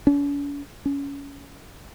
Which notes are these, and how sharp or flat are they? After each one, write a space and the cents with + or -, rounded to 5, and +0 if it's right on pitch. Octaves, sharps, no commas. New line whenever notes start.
C#4 +45
C#4 +20